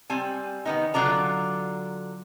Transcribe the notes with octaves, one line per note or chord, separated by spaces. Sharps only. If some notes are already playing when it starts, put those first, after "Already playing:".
G3 C4 G#5
D#3 B3 D#4
D3 F#3 F4 D5 A#5